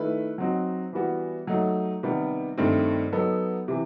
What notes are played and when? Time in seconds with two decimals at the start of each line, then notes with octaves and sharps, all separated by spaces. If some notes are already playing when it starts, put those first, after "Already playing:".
Already playing: D#3 A3 E4 B4
0.38 F#3 C4 D#4 F#4
0.93 E3 G3 B3 F#4
1.47 F#3 A3 D#4
2.03 C3 D#3 G3 B3
2.58 G2 D#3 A3 C4
3.12 F#3 B3 D#4 A4
3.68 C3 E3